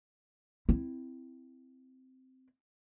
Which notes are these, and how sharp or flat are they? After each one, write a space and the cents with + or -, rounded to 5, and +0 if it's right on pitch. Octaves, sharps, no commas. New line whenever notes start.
C4 -10 E4 +5